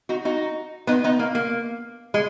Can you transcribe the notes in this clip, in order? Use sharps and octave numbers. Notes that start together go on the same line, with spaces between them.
D#4 F#4
D#4 F#4
B3 D#4
B3 D#4
A#3
A#3
G#3